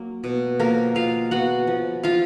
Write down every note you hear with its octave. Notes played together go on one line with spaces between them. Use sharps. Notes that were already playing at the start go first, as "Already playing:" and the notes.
Already playing: F#3 A#3
B2
F3 A#3 A#4
G#3 F4 F5
B3 F#4 F#5
F3
F3 F4 F5